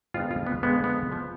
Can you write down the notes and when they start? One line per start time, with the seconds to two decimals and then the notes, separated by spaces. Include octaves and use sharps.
0.14 F2 D3 G#3 B3 F4
0.31 F4
0.47 B3
0.63 F2 D3 G#3 B3
0.84 B3
1.12 F3 B3